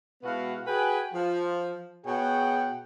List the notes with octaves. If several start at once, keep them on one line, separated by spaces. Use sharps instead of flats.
B2 G#3 B3 E4 F#4 F5
F#4 G#4 B4 G5 G#5
F3
B2 G#4 C#5 F#5 G5